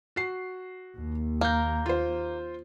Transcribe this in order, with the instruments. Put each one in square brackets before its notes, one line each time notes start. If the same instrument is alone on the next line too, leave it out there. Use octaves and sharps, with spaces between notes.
[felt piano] F#4 C7
[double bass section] D#2
[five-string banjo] A#3 [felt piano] A#5 G6
[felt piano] F4 C5